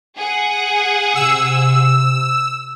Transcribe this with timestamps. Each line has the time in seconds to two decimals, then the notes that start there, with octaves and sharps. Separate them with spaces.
0.17 G#4 F#5
1.15 C3 E6